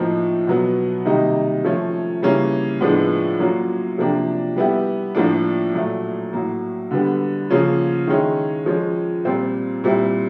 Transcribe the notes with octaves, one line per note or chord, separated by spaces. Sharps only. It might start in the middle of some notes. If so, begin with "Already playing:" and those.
Already playing: A2 F3 A#3 D#4
B2 F#3 B3
C3 D#3 G3 A#3 D#4
F3 A3 C#4
C#3 E3 G3 A#3 C#4
A2 F3 G#3 B3 D4
F#3 A#3 C#4 F4
C3 F3 A#3 D4 G4
G3 B3 E4 G4
A2 F3 A#3 D4
A#2 F#3 A3
A2 F#3 A#3
D3 G3 B3
C#3 F3 A#3 C#4 F4
D#3 G#3 C#4 E4
F3 G#3 C#4
A#2 G3 C4 F4
A#2 G3 C4 E4